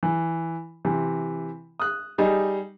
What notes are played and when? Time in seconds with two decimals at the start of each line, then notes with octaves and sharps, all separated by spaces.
0.03 E3
0.85 C3 E3
1.80 D#6 F#6
2.18 G3 D#4 G#4